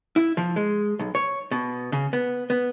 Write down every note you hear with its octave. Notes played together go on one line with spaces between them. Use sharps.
E4
F3
G#3
B1
C#5
B2
C#3
B3
B3